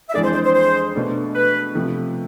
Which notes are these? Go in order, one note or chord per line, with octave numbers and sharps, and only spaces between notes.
E5
F2 E3 G#3 D4 G#4 D5
C5
C5
C5
C5
B2 A3 D4
B4
C3 F3 A3